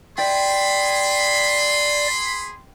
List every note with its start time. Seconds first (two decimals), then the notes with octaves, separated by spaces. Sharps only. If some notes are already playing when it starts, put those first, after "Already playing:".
0.18 G#4 D5 G5 B5 C6